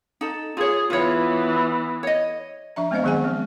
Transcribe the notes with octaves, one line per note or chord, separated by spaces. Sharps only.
D#4 A4
F4 G#4 C#5
E3 B3 F4 C#5
C#5 D#5
F3 D4 E5 A#5
G#3 B3 C4 C5 D#5 F5
D#3 F#3 G#4 F#5 G#5
F3 G#3 C4